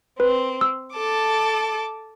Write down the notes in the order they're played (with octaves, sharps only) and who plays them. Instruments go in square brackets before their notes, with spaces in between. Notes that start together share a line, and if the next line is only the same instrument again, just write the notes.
[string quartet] C4 [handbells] B4
[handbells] E6
[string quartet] A4 A5 D6